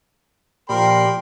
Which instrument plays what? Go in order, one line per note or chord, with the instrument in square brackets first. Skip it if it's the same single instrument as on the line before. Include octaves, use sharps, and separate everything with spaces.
[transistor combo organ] A#2 G4 D5 [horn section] F3 G5 [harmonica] A#4 B5 C6